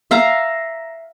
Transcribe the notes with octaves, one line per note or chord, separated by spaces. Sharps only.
E5 F5 A#5